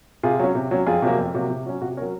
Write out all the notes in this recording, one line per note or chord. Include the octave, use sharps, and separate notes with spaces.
C3 F4 G#4
F#3 C#4
C3
F#3 C#4
F2 F4 G#4
C3 F#3 A#3
F2
C3 F#3 A#3
C3
F#3 C#4
C3 F#4
F#3 C#4 A#4 C#5